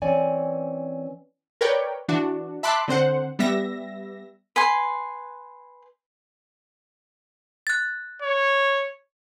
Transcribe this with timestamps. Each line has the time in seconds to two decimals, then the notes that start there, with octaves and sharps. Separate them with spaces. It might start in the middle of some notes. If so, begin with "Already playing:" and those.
0.02 E3 C4 C#4 C#5 D5 G#5
1.61 A#4 B4 C#5 D5 G5
2.08 E3 D4 F#4
2.63 E5 A5 B5 C6 D6 F#6
2.88 D3 C4 C5 F#5
3.39 G3 B3 E5 A#6
4.56 B4 G#5 C6
7.67 F#6 A6
8.22 C#5